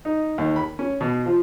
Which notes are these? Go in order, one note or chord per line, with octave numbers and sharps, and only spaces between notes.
D#4
D#2
B5
C#4
B2
F3